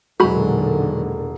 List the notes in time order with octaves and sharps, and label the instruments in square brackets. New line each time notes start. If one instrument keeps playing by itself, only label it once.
[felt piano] E1 G#3 [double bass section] A#2 D3 D#3 [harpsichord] F#3 [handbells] F#4 B5